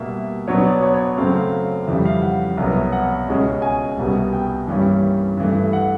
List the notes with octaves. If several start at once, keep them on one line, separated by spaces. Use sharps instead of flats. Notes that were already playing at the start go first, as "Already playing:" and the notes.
Already playing: B2 G3 A#3 E5
B2 F#3 B3 D4 C#5
D5
C#5
C#5
F#2 C#3 F#3 A3 C4 F5
F5
F5
F2 C#3 E3 G3 E5
F5
F#5
C2 B2 F#3 B3
F#5
C#2 B2 G#3 C#4
G#5
C2 B2 G3 B3
G5
G2 E3 G3 A#3 C#4
G2 E3 A3
F#5